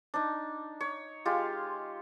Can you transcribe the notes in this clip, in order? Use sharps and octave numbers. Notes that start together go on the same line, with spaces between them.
D4 D#4
C#5
G#3 F4 G4